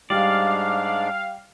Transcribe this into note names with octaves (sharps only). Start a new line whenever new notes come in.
G#2 G3 G#3 D4 D5 F5